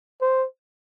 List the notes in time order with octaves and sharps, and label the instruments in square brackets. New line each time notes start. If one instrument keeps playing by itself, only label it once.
[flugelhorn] C5